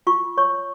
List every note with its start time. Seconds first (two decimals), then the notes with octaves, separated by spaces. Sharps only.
0.07 F4 C#6
0.38 C#5 C#6